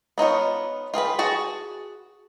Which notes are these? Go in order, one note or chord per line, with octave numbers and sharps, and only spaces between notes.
B3 D#4 F4 C#5
F4 G#4 A4 B4
F#4 G#4 A5